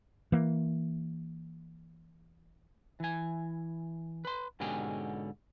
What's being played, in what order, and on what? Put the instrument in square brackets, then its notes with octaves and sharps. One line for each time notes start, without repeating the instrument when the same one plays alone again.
[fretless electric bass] E3 A#3
[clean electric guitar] E3 G#5
B4 C6
G#2 B2 D3 C#4 G4 G#4